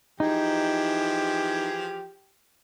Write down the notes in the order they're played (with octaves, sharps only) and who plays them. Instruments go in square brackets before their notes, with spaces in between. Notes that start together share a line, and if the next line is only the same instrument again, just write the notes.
[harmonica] E3 F3 G#4 [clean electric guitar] D#4 [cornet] G4